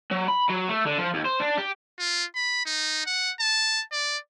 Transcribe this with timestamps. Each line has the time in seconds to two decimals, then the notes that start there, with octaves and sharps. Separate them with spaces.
0.11 F#3
0.28 B5
0.49 F#3
0.68 A3
0.86 D3
0.98 F3
1.14 D#2
1.25 C5
1.40 D4
1.58 G4
1.99 F4
2.35 B5
2.66 D#4
3.06 F#5
3.40 A5
3.92 D5